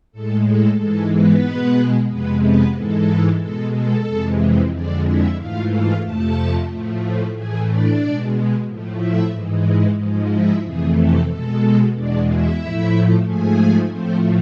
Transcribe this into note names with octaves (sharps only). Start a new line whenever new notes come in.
A2 G#3 A4
A4
G#2 E3 G#3 A4
B3 B4
B2 G#3
F2 C3 G#3 B3 B4
B3 B4
G#2 E3 G#3 A4
B2 G#3 A4
A4
F2 C3 E3 G#3
F2 D3 G#3 D4 D5
E4 E5
G#2 E3 A3 F4 F5
F4 F5
F2 C3 F3 A3 A4 A5
A2 F3 A3
A2 E3 A3 G#4 G#5
D4 D5
B2 G#3
A2 F3 A3
E4 E5
G#2 E3 G#3
G#2 F3 G#3
E4 E5
F2 C3 E3 A3 G#4
A4
B2 G#3 A4
E2 B2 G#3 D4 D5
E4 E5
A2 F3 A3
G#2 F3 A3 G#4 G#5
A2 F3 A3 C4 C5